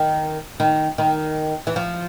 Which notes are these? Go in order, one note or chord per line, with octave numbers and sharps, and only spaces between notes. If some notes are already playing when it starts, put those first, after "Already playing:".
Already playing: D#3
D#3
D#3
E3
F3